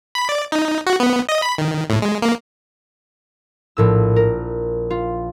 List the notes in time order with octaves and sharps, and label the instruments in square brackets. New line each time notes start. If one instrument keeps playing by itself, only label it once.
[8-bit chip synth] B5
D5
D#4
F#4
B3
D#5
B5
D#3
A2
G#3
A#3
[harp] A#1 A2 E6
A#4
F4